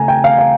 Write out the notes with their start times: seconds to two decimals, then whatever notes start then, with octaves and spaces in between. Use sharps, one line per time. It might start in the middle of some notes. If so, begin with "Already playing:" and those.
Already playing: C#3 A3 G#5 A#5
0.08 G5
0.24 F5
0.39 F5